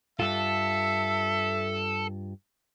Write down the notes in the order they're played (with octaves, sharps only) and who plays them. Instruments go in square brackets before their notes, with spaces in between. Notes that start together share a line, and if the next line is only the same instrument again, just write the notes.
[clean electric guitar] G2 F4 [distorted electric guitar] A4 [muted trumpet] E5